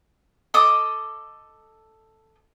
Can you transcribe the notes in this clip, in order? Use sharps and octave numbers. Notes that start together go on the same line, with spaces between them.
A4 D#5 D6 D#6